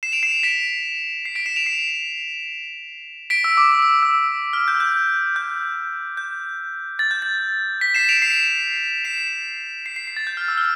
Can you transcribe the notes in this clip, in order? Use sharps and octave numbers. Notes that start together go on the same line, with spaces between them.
C7 E7
D7 F7
C7 E7
B6 D7
C7
B6 D7
C7 E7
D7 F7
C7 E7
B6 D7
E6
D6
E6
E6
E6
F6
G6
G6
G6
G6
A6
G6
A6
B6
C7 E7
D7 F7
C7 E7
C7 E7
C7
C7
C7
A6
G6
F6
E6
F6